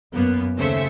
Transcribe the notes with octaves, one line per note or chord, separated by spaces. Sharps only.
F#2 A#3 B3
D#2 C#3 A3 C5 E5 C#7